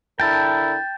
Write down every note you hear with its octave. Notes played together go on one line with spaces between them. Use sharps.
D3 E4 A#4 G5 A5